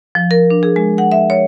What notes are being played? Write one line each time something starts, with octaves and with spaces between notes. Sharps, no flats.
F3
A#4
D4
G#4
G#3
F#5
E5
C#5